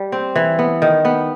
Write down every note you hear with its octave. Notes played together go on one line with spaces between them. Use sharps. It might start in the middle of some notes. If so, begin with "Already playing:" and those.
Already playing: G3
C4
E3
B3
D#3
B3